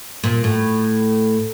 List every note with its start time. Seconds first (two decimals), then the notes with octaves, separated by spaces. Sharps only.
0.24 A#2
0.44 A2